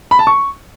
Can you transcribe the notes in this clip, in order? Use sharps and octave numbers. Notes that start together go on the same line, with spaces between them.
B5
A5
C#6